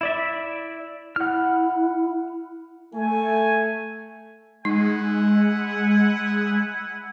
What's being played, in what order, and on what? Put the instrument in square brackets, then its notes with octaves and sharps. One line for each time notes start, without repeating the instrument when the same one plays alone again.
[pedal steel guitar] E4 D5 E5
[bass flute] E4 [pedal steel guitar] F#5 F6
[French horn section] A3 [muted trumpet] G#5
[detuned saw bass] G#3 [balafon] D#4 [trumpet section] E4 F#5 G#5